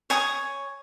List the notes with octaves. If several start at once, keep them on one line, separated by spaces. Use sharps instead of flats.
C#5 G#5 C#6 D#6